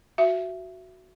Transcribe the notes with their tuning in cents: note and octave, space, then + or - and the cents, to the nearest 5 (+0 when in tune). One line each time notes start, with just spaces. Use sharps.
F#4 +0 E5 +20